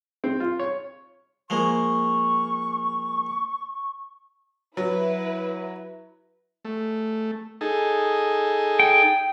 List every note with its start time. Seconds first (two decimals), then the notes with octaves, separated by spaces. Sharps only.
0.24 C4
0.40 F4
0.59 C#5
1.50 F3 G#3 A#3 C#6
4.77 F#3 E4 B4
6.65 A3
7.61 D#4 G#4 A4
8.80 G5